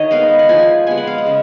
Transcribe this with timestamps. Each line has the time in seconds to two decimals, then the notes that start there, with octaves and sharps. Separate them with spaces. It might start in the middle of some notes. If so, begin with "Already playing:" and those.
Already playing: D#3 C#5 D#5
0.11 G#3 B3 F5
0.39 F#5
0.49 F3 G#5
0.87 G#3 B3 G#5
0.98 F#5
1.07 F5
1.18 F#5
1.26 C#3